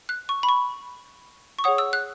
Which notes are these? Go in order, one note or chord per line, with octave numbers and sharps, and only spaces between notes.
F#6
C#6
B5
C#6
C#6
G#4 C#5 F#5 D#6
E6
F#6